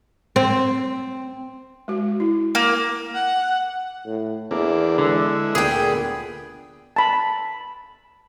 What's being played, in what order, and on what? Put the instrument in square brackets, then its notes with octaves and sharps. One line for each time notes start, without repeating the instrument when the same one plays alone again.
[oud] C4
[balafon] G#3 F#4
E4
[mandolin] A#3
[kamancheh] F#5
[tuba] A2
[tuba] E2 [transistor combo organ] E3 A#3 D4
[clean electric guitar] D3 [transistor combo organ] G#3 E4
[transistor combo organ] D2 B3 [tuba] A#2 [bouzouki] G#4 G5
[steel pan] A5 B5